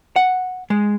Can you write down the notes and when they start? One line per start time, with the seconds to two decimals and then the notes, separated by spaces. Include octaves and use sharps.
0.16 F#5
0.70 G#3